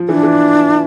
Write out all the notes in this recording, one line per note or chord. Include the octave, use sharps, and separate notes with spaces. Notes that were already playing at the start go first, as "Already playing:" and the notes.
Already playing: F3
E3 D4
E3